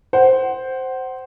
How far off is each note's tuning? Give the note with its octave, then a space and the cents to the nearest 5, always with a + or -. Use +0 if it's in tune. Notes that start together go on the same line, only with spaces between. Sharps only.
C5 +0 F#5 +25